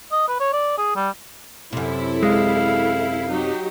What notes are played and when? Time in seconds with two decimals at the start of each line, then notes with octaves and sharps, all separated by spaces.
0.12 D#5
0.28 B4
0.40 C#5
0.53 D5
0.78 G#4
0.96 G3
1.73 F#2 C3 E4 A4
2.23 G#3 F5
3.29 F#3 D#4 G4